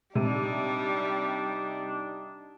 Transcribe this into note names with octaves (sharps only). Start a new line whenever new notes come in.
C3 G3 D4 D#4 G4